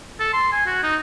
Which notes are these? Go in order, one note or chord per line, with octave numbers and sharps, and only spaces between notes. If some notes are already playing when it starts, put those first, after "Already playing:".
A4
C6
G#5
F#4
D#4